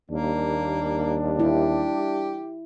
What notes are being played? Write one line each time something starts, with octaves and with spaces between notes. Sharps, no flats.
D#2 G3 A#3 D4
E4 G4